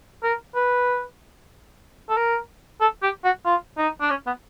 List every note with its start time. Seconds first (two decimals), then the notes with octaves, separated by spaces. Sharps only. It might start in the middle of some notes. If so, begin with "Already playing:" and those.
0.23 A#4
0.55 B4
2.09 A4
2.17 A#4
2.81 A4
3.03 G4
3.24 F#4
3.45 F4
3.78 D#4
4.01 D4
4.10 C#4
4.26 B3